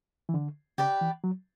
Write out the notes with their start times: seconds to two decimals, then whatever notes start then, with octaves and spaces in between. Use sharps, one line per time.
0.29 E3
0.34 D3
0.78 C#3 G4 B4 D5
1.01 E3
1.24 F#3